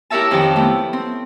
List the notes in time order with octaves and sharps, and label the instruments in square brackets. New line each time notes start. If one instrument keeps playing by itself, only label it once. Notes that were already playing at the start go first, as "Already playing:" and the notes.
[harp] E4 G4 A#4 C#5 E5 A5
F2 D#3 G4 G5 A5
A3 B3 E4
C4